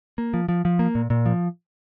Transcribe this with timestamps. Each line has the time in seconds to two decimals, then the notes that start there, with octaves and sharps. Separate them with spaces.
0.18 A#3
0.34 F3
0.49 F3
0.65 F3
0.79 A#3
0.95 A#2
1.10 A#2
1.26 F3